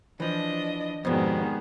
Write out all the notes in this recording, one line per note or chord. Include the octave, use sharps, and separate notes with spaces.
E3 F3 D4 D#5
F2 G#2 B2 D#3 G3 B3 G#4